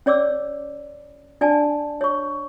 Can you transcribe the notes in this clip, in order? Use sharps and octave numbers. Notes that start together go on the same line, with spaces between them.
C#4 C#5 D5 D6 E6
D4 D5 G#5 A5
C#5 C#6